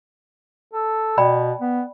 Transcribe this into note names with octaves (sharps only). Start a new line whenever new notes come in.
A4
B2 D5 G5 B5
B3